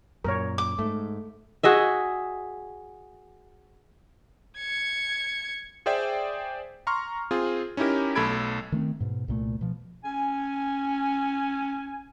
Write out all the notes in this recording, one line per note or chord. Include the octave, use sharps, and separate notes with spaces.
F#2 A#2 A#4 C#5
D6
G#2 A3
F#4 G#4 D#5 E5
G#6 C#7
G#4 C5 D5 E5 G5
A#5 C6 C#6 F6
C4 F4 G#4
C#4 D#4 E4 G4 A#4
B1 A3 A4 B5 G#6 D7
D#3 A3 A#3 C4
G#2 B2
C2 A#2 A3
B2 F3
C#4 G#5